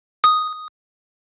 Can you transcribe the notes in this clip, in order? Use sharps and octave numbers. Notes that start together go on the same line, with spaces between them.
D#6